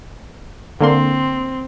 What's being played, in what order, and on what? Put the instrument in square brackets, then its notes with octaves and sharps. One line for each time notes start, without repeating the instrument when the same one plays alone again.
[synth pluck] D3 A#3 C6 [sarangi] C4